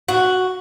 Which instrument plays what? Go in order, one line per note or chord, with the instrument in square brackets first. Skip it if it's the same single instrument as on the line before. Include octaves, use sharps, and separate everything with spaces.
[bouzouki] F#4